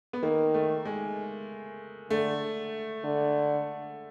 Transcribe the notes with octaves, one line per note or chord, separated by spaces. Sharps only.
B3
D#3 A#3
A3
G#3
D3 A3
D3